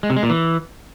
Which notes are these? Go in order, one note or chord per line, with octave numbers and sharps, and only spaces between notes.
G#3
C3
G#3
A#2
E3